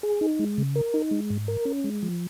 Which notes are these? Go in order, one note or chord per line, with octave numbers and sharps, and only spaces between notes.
G#4
D#4
G#3
C#3
A#4
D#4
G#3
G#2
A#4
C#4
G#3
F3